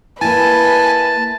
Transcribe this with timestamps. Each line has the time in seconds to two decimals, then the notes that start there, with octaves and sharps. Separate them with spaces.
0.21 A#3 E4 B4 G#5 A5